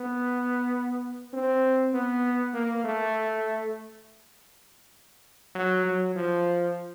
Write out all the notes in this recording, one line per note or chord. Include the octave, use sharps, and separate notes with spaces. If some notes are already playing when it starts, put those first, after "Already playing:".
Already playing: B3
C4
B3
A#3
A3
F#3
F#3
F3